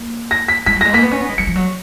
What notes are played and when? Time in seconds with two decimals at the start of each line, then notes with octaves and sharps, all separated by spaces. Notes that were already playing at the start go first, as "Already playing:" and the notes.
Already playing: A#3
0.31 A#6
0.48 B6
0.66 G#3 B6
0.76 F#3
0.81 G#3 A#6
0.93 A#3 B6
1.02 B3
1.11 C#4
1.21 B3
1.29 G#3
1.38 F#3 C#7
1.47 F3
1.56 F#3